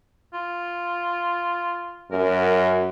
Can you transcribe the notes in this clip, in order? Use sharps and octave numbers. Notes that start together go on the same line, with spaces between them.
F4
F#2 A#4